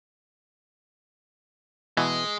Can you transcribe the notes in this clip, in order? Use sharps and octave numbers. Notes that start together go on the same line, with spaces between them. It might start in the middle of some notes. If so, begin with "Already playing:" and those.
B2 E3 G#3